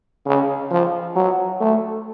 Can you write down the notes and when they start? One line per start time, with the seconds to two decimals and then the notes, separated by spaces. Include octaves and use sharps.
0.26 C#3
0.71 F3
1.16 F#3
1.61 A3